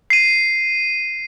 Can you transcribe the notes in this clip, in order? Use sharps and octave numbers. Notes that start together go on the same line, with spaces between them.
C7 D#7